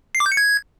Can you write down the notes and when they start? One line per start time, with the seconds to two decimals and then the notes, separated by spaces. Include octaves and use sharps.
0.15 C7
0.20 D6
0.26 G6
0.32 C#7
0.37 G#6